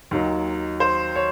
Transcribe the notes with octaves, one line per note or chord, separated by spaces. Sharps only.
D#2 D#3 F#3
C5
C#5